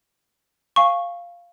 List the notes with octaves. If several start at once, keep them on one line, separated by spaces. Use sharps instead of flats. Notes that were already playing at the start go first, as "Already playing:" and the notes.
F5 G#5 C#6